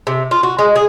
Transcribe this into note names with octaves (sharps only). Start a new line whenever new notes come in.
C3
F4
F#4
G#3
G#4